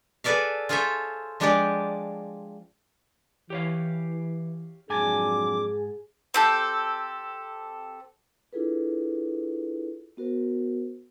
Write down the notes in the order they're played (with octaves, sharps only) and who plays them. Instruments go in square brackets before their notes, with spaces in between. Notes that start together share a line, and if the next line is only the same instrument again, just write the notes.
[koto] G#4 A4 B4 D5 E5 F5
F4 G#4 A4 C5 C#5 E5
F3 G#3 D4 G4 G#4 D5
[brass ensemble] E3 [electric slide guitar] G4 C#5 F5
[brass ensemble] F2 F#3 D4 [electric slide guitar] G#2 G#5 A5 [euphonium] G#4 [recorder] D6
[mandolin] C4 G4 A4
[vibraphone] D4 E4 F4 G#4 A4 B4
B3 F#4 A#4 C5